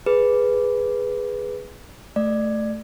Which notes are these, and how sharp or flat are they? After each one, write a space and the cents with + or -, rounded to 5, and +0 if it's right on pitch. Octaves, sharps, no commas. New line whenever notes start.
G#4 +0 B4 +0
A3 +0 D5 +15